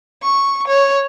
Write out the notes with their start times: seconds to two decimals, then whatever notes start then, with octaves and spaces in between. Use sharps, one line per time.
0.23 C#6
0.68 C#5